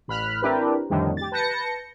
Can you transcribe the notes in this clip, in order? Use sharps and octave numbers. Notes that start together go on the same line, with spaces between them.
A1 B5 F6 F#6
C4 D4 E4 G4 A#4 B4
F2 A2 D3 D#3 G3
G4 A6
B4 A5 G6 A#6 C#7